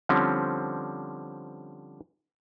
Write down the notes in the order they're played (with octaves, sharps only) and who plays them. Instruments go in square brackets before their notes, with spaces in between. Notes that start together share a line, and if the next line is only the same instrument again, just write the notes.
[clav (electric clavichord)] D3 F3 G3 C4 C#4